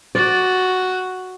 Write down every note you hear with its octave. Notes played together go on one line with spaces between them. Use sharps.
F#4 D5